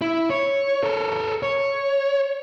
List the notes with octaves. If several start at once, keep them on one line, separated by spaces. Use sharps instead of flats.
E4
C#5
A4 A#4
C#5